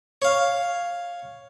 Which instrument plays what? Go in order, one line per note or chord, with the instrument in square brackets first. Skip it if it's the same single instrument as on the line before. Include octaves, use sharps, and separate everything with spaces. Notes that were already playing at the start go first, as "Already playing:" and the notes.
[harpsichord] C#5 F5